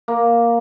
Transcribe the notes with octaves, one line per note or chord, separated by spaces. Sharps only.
A#3